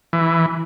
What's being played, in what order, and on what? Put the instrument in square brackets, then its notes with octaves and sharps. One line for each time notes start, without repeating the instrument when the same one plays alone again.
[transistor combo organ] E3